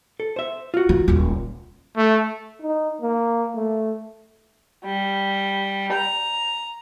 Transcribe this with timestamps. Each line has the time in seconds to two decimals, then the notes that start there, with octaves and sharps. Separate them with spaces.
0.20 A4
0.36 C5 E5
0.74 F4 F#4
0.89 D#3
1.08 D#1 C#2
1.97 A3
2.62 D#4
3.02 A#3
3.56 A3
4.85 G3
5.94 A#5